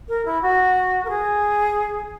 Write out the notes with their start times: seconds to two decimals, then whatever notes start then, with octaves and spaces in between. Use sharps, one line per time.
0.09 A#4
0.25 E4
0.42 F#4
1.05 A#4
1.10 G#4